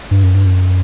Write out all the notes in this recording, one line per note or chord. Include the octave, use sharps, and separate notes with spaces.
G2
F#2
G2
F#2